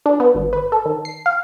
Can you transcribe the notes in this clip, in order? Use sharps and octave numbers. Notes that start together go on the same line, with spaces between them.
D4
B3
G#1
B4
A4
D#3
C7
F5